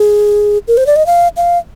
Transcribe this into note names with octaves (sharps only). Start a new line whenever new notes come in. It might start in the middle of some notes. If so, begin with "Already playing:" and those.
Already playing: G#4
A#4
C5
D5
D#5
F5
F5